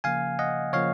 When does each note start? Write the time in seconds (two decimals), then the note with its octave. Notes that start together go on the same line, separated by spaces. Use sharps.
0.04 C#3 F3 A#3 F5 G#5
0.39 D#5 F#5
0.73 C#3 F3 A#3 C#5 F5